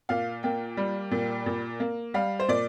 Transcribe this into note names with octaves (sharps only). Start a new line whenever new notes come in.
A#2 F5
A#3 G5
G3
A#2
A#2
A#3
G3 F5
C5
A#2 D5